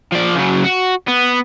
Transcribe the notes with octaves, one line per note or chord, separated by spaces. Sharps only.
F3 D5
C#3 F#3
F#4
B3